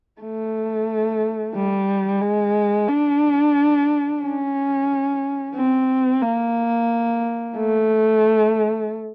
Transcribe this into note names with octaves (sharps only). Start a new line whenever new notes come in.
A3
G3
G#3
D4
C#4
C4
A#3
A3